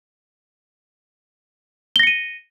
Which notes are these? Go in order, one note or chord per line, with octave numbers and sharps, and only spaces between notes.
A#6 C#7 D#7 G7